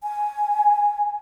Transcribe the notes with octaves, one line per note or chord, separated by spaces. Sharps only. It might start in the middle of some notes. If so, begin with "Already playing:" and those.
G#5